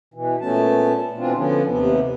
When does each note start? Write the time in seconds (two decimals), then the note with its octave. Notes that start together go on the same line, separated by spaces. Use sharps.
0.14 B2 E3
0.41 A#2 A3 B3 C#4 A5
1.17 B2 E3 C4 D4 F4
1.36 D3 F3 B3 C#4
1.67 D#2 C3 B3